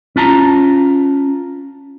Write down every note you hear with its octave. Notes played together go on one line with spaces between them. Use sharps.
C#4 F4 A5 A#5